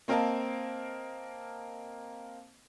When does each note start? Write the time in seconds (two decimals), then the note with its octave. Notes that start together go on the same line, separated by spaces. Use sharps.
0.08 A#3 C4 A#4 D#5 F5 A5